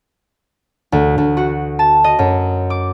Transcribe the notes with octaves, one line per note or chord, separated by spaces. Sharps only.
D2
D2
F#4
A5
D#5
F#2
D6